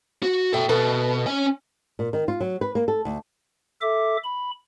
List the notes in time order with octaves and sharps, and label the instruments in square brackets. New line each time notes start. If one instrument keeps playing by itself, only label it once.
[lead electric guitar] F#4
[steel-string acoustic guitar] B2 A3 [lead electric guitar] A4 G5
[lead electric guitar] B2 [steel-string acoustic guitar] A4 B4
[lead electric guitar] C#4 G#5
[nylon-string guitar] A#2
D#3
F4
F#3
B4
A#3
A4
D2
[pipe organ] A4 E5 D6
B5